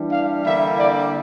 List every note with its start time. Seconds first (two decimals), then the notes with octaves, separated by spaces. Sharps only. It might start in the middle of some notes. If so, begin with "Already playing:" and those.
Already playing: E3 G3 D4
0.12 F5
0.45 D3 G3 A#3 E4 E5
0.79 D5